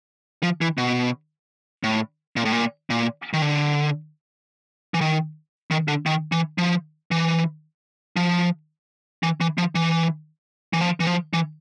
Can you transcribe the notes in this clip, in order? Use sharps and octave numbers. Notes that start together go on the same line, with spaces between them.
F3
E3
B2
A2
A#2
A2
A#2
A#2
D#3
D3
E3
D#3
D#3
D3
D#3
E3
F3
E3
F3
E3
E3
F3
E3
E3
F3
E3
F3
E3